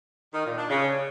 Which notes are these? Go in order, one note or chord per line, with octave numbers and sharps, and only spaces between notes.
D#3
A#2
D4
C#3